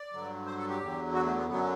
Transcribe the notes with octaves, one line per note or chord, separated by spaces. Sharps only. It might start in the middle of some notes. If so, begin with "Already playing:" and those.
Already playing: D5
G2 D3 F#3
C5
A4
G4
E2 D3 F#3
F#4
A3
B3
F#2 D3 F#3 B3